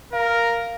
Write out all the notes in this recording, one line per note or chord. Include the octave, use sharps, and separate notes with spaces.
A#4 F5